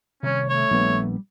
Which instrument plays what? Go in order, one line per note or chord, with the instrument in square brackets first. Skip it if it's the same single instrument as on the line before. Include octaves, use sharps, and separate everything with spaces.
[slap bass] C3 D#3 G3 [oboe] C#4 [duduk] C#5
[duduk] A3 [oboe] C#5
[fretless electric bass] A#1 B3 [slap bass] G3